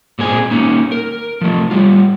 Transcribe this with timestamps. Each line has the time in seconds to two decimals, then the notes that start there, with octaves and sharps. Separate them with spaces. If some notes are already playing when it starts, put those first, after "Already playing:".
0.19 A#2 G#3 C4 G#5
0.51 A#3 C#4 D#4
0.92 A#4
1.41 F3 A3
1.71 G3 F4